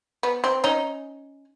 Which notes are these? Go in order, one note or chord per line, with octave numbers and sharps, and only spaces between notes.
B3
C4
C#4 D#4